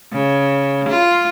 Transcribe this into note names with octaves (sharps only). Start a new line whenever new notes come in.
C#3
F4